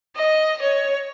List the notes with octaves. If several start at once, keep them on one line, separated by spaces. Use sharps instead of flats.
D#5
C#5